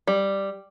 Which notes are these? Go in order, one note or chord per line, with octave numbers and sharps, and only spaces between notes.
G3